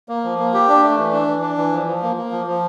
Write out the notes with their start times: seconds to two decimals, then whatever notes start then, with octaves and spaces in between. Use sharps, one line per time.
0.09 A#3
0.24 F3
0.38 A#3
0.54 G4
0.68 D4
0.83 A3
0.98 E3
1.13 D4
1.28 E3
1.42 D4
1.57 E3
1.72 F3
1.87 F3
2.02 A#3
2.17 A#3
2.31 F3
2.47 F3